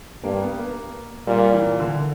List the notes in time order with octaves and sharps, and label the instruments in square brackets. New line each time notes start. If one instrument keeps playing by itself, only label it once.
[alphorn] G2 [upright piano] A#3
[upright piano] B3
A#3
[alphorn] A#2 [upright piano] G3
[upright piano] E3
D3